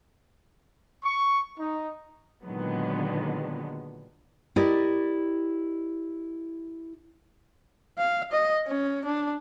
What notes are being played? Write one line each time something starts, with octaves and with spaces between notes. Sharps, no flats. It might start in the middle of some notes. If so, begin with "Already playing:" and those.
C#6
D#4
A#2 D3 D#3 F#3 G#3 B3
E4 G4 A#4 D5 D#5
F5
D#5
C#4
D4